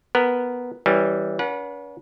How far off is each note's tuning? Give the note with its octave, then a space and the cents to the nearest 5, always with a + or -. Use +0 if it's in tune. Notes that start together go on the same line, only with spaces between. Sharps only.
B3 +0 A#4 +0
E3 -15 G3 +0 C#4 -25
C#4 +45 B4 -35 F#5 -25